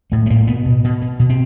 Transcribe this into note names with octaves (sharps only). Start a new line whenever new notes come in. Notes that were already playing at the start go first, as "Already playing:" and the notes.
A2 A3
A3
A2 A#3
B2 B3
B2
B2
B2
B2
C4